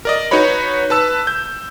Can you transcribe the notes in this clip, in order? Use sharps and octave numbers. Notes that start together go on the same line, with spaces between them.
A#4 D5 D#5
D#4 F#4 B4 C#5 B5
B4 A5 E6
G6